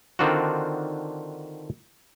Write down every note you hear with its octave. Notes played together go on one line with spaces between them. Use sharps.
D3 D#3 C4 D4 F4 F#4